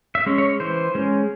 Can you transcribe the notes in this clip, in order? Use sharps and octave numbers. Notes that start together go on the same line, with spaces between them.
E5
G#3 C#4
C#5
E3 C5
G#3 C#4